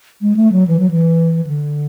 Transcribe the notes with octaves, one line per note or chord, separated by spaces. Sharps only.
G#3
A3
F#3
E3
F#3
E3
D3